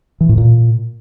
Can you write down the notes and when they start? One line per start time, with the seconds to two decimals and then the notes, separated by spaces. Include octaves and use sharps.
0.21 E3
0.29 A2
0.38 A#2